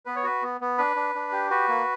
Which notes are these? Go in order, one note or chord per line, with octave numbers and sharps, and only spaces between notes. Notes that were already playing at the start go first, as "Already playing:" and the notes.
B3 B4
C#5
F#4 B4
B3
B3
D4 B4
D4
D4
G4
F#4 B4
A#3